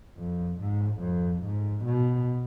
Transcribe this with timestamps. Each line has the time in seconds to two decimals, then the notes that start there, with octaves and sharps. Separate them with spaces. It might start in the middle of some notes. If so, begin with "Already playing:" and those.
0.18 F2
0.60 G#2
1.01 F2
1.43 G#2
1.84 B2